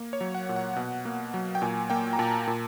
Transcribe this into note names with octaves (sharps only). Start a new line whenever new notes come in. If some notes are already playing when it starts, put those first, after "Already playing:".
Already playing: A#3
C#5
F#3
F#5
A#2
F#5
B2
A#3
F#3
G5
A#2 G#5
A#3 G5
A#5
A#2 A5
A#2